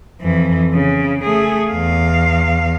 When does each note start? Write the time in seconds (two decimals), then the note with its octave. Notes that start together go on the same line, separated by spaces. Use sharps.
0.21 F2 E3
0.74 C#3
1.24 A3 G#4
1.72 E2 F5